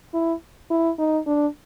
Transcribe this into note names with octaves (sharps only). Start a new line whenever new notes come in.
E4
E4
D#4
D4